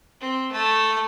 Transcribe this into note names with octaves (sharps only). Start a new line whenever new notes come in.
C4
A3